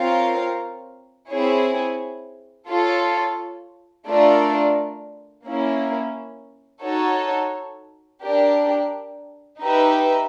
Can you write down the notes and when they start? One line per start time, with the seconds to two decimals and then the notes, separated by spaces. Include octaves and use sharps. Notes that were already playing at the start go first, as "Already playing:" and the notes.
Already playing: C4 F4 A#4 C#5 F5
1.31 C4 E4 G#4 C#5
2.69 F4 A4 C#5
4.07 A3 D4 F4 A#4 D5
5.45 A#3 C#4 E4
6.84 D#4 F#4 A4 C#5
8.22 D4 G4 A#4
9.60 D#4 G4 B4 E5